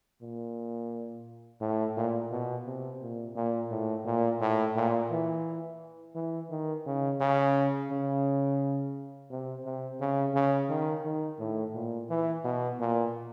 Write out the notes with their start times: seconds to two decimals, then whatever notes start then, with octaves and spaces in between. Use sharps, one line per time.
0.22 A#2
1.61 A2
1.97 A#2
2.32 B2
2.66 C3
3.02 A#2
3.36 A#2
3.71 A2
4.05 A#2
4.41 A2
4.76 A#2
5.11 E3
6.15 E3
6.51 D#3
6.86 C#3
7.20 C#3
7.91 C#3
9.31 C3
9.65 C3
10.01 C#3
10.34 C#3
10.69 D#3
11.05 D#3
11.40 A2
11.75 A#2
12.10 E3
12.44 B2
12.80 A#2